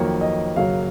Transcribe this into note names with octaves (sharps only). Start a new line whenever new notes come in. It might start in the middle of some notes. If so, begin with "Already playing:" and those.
Already playing: F2 D#3 F#3 A#3 C#5
D#5
F#2 C#3 F#3 A#3 F5